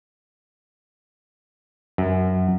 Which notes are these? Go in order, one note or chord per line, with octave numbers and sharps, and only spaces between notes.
F#2